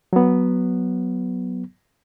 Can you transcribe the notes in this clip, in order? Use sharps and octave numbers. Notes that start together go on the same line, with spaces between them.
F#3 B3